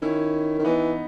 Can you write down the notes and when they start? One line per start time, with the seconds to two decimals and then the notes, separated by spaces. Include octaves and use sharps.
0.02 D#3 C#4 E4
0.59 D#3
0.64 E3 B3 D#4